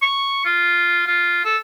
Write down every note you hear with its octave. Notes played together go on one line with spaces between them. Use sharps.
C#6
F4
F4
A4